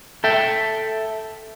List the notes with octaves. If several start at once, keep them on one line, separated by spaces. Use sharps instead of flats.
A4 E5 G5